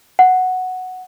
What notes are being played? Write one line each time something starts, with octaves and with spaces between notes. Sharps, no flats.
F#5